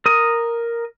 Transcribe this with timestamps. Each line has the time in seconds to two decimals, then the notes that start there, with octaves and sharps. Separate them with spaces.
0.06 A#4 D#6